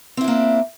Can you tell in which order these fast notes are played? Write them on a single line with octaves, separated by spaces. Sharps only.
C4 E4 D4 A#3